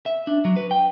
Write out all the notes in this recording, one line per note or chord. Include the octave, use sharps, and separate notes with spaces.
E5
D4
F#3
B4
G5